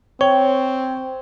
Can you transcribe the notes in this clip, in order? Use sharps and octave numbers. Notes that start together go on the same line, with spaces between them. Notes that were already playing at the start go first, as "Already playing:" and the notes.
C4 C#5 G5